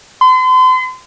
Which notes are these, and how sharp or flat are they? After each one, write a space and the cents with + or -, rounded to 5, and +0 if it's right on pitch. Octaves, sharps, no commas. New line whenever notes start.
C6 -40